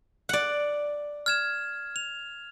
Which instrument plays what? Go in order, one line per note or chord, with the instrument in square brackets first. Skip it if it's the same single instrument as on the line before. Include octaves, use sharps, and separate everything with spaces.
[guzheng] D5 F#5
[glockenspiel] F6 G#6 E7
F7